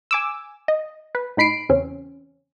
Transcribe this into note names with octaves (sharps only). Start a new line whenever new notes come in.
G#5 D6 E6
D#5
B4
A2 D#4 B5 C7 D7
E2 C#3 C4 C#4